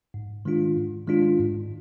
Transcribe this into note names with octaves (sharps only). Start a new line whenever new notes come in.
G#2
D#3 G#3 D4 F4
G#2
D#3 G#3 D4 F4
G#2